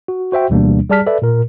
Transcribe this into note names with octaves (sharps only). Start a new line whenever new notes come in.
F#4
F#4 C5 E5 G5
D2 B2 E3 G3 A#3 D4
G3 G#4 D5 A5 F6 B6
A4 B4 D5 E5
A#2 A#4